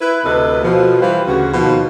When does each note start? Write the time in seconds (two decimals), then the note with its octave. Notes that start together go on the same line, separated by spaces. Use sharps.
0.01 E4 B4
0.24 D2 C3 A4 B4 D#5
0.63 B2 F3
1.00 E3 G3 B4 C5 F5
1.27 D2 C#3 F#4
1.54 D#2 B2 D#3 F3